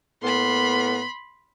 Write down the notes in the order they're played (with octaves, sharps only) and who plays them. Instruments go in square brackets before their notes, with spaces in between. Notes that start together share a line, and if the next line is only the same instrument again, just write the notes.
[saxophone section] A2 A#3 B3 [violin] B5 C6